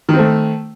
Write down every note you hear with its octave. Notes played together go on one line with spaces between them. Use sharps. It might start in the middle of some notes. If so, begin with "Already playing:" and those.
D#3 A3 C4